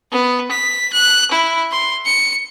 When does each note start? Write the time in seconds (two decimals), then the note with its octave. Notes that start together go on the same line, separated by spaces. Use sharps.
0.12 B3
0.51 B6
0.93 F#6
1.31 E4
1.72 C6
2.06 C#7